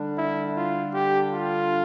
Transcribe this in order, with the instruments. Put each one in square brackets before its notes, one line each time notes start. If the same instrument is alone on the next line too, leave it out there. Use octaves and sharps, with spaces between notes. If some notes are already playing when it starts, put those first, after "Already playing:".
Already playing: [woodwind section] D3 G3 D4
[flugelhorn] E4
F4
G4
F4